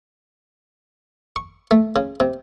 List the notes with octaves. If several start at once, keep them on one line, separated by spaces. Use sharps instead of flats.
C#6
A3
C#3
C3